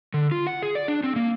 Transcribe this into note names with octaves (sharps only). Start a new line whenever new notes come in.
D3
F4
F#5
G#4
D5
D4
C4
A#3